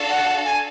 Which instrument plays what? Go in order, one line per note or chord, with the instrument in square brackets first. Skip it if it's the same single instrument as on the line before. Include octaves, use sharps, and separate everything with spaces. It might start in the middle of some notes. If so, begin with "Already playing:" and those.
Already playing: [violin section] D4 F#4 A4 F5 A5
[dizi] F#5
G#5